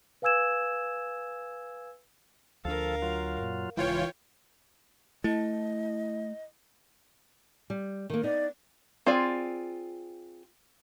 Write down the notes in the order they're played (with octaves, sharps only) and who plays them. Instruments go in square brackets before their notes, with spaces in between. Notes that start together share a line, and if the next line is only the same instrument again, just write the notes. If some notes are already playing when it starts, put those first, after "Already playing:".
[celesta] B4 F5 G#5 E6 G#6 E7
[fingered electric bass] D2 D4 [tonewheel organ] F3 A4 [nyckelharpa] A#4 F5
[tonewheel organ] F#3 F4
[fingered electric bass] F#2 A#2
[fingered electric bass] D#1 C#3 G#3 [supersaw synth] E3 F4 C#5 [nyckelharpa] G5
[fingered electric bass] A3 [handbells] E4 [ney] D#5
[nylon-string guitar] G3
D#3 A#3
[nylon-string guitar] B3 D#4 [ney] D5
[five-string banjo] C4 F4 G#4 D5